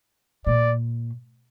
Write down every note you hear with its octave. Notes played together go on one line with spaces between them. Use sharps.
A#2 D5